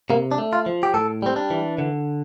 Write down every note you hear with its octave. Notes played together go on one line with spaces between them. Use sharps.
C3 A#3
D4
A3
F4
F3
G4
A2 A4
G3 C4
D4
E3
D3